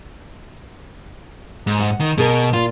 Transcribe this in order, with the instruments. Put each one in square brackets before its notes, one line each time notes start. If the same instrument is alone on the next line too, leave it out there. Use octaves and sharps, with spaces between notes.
[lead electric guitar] G#2
[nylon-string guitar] F#5
[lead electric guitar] D#3
[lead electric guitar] B2 [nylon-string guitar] G#4 A#4
[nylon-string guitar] A#2 [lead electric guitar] F4